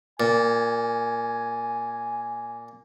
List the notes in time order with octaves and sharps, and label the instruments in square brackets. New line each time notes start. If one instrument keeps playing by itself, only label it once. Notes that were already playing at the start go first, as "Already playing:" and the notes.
[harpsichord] A#2 [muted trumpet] G#5